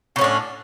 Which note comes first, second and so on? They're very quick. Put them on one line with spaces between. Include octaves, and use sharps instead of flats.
C#3 C#4 A2 D4